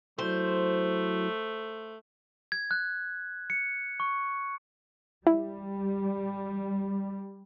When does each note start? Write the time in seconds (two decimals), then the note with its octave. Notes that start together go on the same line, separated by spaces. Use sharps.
0.19 F#3 A3 E4 F#4 C5
2.52 G#6
2.71 F#6
3.50 C#7
4.00 C#6
5.27 G3 E4